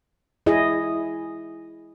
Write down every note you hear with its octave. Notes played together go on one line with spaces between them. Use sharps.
E4 G#4 D#5